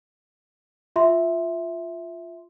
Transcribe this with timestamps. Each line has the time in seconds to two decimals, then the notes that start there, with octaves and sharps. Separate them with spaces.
0.96 F4 E5 C6